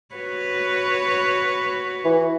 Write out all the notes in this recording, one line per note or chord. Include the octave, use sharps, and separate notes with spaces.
F#4 B4 C#5
E3